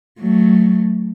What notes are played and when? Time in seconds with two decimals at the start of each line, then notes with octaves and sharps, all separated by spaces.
0.20 F#3 A3